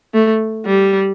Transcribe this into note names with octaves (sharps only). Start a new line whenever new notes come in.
A3
G3